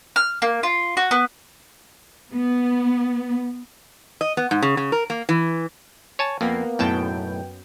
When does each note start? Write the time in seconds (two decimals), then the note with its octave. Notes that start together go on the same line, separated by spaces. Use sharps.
0.16 F6
0.42 A#3
0.63 F4
0.97 F#4
1.11 B3
2.32 B3
4.21 D#5
4.37 B3
4.51 G#2
4.62 C#3
4.77 C#3
4.92 A#4
5.10 A#3
5.29 E3
6.19 C#5 G#5 A5
6.41 F2 A#3 B3
6.79 B1 F#2 A2 B3 G5 A5